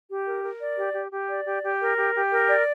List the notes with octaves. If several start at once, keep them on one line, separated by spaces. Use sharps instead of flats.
G4
A#4
A#4
D5
G4
G4
G4
D5
G4
G4
A#4
G4
G4
A#4
D5